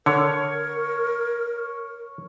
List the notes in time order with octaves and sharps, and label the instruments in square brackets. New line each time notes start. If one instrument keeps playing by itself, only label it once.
[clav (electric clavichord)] D3 [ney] A#4 [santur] C#5